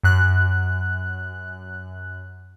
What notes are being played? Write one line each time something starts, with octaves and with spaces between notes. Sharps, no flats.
F#2 F#6